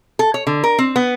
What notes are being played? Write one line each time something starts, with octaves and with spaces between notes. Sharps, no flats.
A4
C#5
D3
A#4
C4
B3